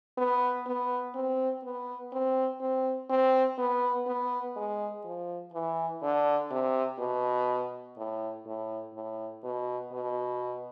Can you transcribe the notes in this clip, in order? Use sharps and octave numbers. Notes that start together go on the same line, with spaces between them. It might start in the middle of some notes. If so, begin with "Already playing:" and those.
B3
B3
C4
B3
C4
C4
C4
B3
B3
G#3
F3
E3
D3
C3
B2
A2
A2
A2
B2
B2